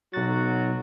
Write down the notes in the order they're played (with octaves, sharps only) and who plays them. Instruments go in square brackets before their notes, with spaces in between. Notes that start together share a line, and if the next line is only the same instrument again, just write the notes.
[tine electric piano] B1 A6 [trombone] F#3 [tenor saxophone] F#4